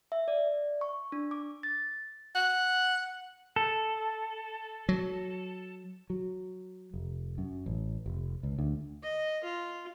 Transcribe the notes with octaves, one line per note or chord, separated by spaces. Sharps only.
E5
D5
C#6
D4
D6
A6
F#5
A4
F#3
F#3
F1
F#2
A1
F1
C#2
D2
D#5
F4